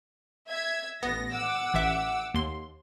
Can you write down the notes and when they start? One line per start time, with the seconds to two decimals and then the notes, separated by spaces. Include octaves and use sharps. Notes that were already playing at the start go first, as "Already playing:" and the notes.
0.48 E5 G#6
1.03 A1 B3 A#6
1.34 F#5 D6 E6
1.74 A1 E5
2.34 D#2 C6